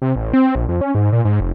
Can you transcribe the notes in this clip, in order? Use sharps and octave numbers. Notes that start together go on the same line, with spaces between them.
C3
A1
C4
A#1
F2
C#4
G#2
A#2
G#2
F1